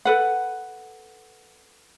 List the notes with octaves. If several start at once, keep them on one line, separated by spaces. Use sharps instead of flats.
A4 B4 F#5